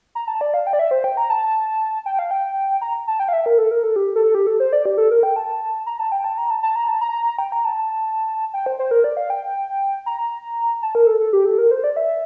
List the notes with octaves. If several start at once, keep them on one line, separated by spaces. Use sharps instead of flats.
A#5
A5
D5
F5
G5
D5
E5
C5
G5
A#5
A5
G5
F5
G5
A#5
A5
G5
F5
E5
A#4
A4
A#4
A4
G4
A4
G4
A4
C5
D5
G4
A4
A#4
G5
A5
A#5
A5
G5
A5
A#5
A5
A5
A#5
A5
A#5
G5
A#5
A5
G5
C5
C5
A#4
D5
F5
G5
A#5
A5
A#4
A4
A4
G4
A4
A#4
C5
D5
E5